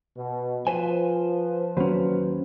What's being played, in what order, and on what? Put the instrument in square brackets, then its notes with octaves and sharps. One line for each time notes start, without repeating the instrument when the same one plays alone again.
[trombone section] B2
[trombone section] F3 [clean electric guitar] B4 C5 G#5
[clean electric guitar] D#2 C#4 [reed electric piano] F#3 B4 C5